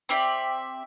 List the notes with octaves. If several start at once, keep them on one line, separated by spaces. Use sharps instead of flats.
C4 G4 D5 E5